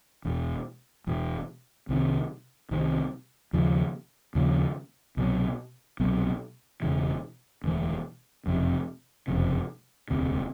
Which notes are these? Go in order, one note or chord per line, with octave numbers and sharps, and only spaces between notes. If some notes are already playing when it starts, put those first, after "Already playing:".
E1 E2 B2
E1 E2 B2
C2 C3 D#3
C2 C3 D#3
D#2 C#3 F3
D#2 C#3 F3
C2 B2 F#3
C2 B2 F#3
E1 D2 C#3 E3
E1 D2 C#3 E3
F#1 F2 C3
F#1 F2 C3
E1 D2 C3